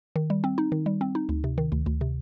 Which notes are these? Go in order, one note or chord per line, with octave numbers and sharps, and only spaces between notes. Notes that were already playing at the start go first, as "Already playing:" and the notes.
D#3
G3
C4
D#4
D#3
G3
C4
D#4
D2
C3
D#3
D2
D2
C3